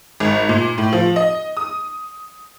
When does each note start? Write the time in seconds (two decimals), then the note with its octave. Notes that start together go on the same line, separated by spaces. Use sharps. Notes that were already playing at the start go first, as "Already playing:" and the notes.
0.20 G#1
0.49 A#2
0.78 A2
0.93 F3
1.16 D#5
1.57 D#6